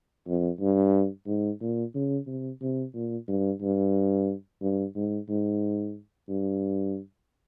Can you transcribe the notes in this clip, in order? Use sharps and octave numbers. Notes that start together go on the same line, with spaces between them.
F2
G2
G#2
A#2
C#3
C3
C3
A#2
G2
G2
G2
G#2
G#2
G2